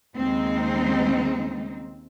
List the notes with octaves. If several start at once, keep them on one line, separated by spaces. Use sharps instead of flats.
D#2 C#3 G#3 C4 D#4